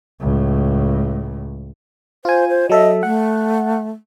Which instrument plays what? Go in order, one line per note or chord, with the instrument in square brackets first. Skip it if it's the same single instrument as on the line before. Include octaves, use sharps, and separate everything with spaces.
[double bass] C#2 A2
[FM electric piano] F4 G#5 [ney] C5
[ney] C5
[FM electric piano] F#3 A4 E5 [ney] D#5
[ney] A3 [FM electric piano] F#5